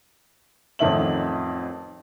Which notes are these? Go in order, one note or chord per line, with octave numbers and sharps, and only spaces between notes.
A1 F2 D#3 E5 F#7